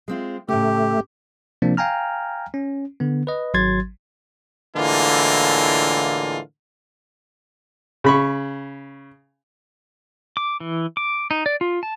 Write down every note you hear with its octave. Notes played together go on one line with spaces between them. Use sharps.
G#3 C4 F4
A2 C#3 A3 G4
C3 F3 A#3 C4 D4
F5 G5 G#5 A#5 F6
C#4
D3 B3
B4 D#5
G#1 F#3 C6 G#6 A6
A2 D3 E3 G#3 A#3 F4
C#3 B5 C#6
D6
E3
D6
D#4
D5
F4
A5